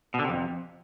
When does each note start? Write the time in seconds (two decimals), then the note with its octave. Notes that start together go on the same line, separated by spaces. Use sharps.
0.14 B2
0.19 D3
0.24 C3
0.29 F2